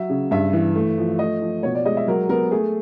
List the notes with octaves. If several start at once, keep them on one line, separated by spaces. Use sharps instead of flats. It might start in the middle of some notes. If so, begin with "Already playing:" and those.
Already playing: F#3 E5
C#3
G2 E5
E3
A3
F3
A3 D#5
F3
B2 C#5
D5
G#3 D#5
E5
F#3 A#4
B3 A#4
A3 G#4